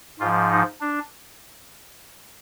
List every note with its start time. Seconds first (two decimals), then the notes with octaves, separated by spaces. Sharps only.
0.19 G#2 F4
0.24 F3
0.51 D#4
0.81 D4